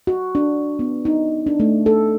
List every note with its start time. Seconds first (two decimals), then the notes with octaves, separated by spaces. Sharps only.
0.07 F#4
0.35 D4
0.79 B3
1.05 D#4
1.47 D4
1.60 A3
1.86 A4